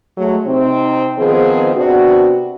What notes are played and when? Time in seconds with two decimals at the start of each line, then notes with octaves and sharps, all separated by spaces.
0.17 F#3 G#3 A3
0.46 C3 C4 D#4
1.18 D#3 F3 B3 C4 D#4 G#4
1.75 C3 B3 C4 D4 F#4